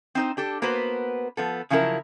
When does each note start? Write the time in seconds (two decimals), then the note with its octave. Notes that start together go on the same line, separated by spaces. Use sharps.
0.15 C4 D#4 C5
0.37 D4 G4 A4
0.62 A#3 B3 F#4 B4 C5
1.37 F3 B3 A4
1.70 C#3 F3 F#3 E4 G4 A#4